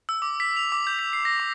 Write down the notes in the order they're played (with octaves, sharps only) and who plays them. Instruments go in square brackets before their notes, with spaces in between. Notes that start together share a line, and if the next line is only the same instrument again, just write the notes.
[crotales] E6
D6
B6
F7
D6
G6
B6
C7
A#6
D6